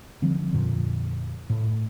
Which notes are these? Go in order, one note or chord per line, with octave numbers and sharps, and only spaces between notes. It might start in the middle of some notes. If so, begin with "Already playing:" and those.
D3 F3 G3 C4
F2 A#2 D3 F3
A2